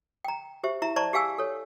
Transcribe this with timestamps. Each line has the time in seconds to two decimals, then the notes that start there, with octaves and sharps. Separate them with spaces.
0.25 G5 A#5
0.64 G4 C5 E5
0.82 E4 E5 A#5
0.96 C5 D5 A5 A#5 C#6
1.13 G4 G#4 F5 G#5 E6
1.38 A4 C#5